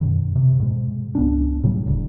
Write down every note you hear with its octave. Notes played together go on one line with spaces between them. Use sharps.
F#2 B2 D#3
C3
G#2 B2 G#3
C#2 B3 C#4 D4
A2 C#3 F#3 G3
E1 D2